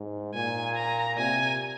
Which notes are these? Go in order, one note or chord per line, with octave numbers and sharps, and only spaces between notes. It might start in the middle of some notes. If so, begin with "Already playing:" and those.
Already playing: G#2
A#2 G#5
A#5
C3 G#5